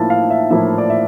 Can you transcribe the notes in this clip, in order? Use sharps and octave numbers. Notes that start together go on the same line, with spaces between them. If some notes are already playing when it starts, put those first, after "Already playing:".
Already playing: A2 F3 A#3 E4 A5
F5
E5
A2 F3 A#3 E4 E5
D5
E5